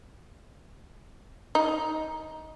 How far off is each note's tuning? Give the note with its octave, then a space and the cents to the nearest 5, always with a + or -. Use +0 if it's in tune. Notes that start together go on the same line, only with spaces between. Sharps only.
D#4 +15